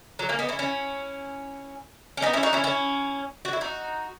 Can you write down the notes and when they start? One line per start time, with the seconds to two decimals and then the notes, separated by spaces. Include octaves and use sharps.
0.19 F#3
0.29 A#3 C#4
0.39 B3 D#4
0.49 C#4 E4
0.59 C#4 E4
2.17 C#4
2.22 B3 D#4
2.33 C#4 E4
2.43 D#4 F#4
2.53 C#4 E4
2.64 C#4 E4
3.45 F#4
3.53 E4
3.61 D#4 F#4